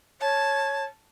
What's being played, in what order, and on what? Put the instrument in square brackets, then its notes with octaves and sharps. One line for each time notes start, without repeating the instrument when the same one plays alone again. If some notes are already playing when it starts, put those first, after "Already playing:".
[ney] C#5 [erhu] A5